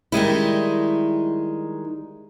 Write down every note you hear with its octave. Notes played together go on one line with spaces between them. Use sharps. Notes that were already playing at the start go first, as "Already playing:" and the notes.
D#3 G3 G#3 E4